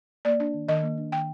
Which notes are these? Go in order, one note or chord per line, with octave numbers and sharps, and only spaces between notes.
A#3 D5
D4
D#3
D#3 D#5
A#3
D4
D#3 G5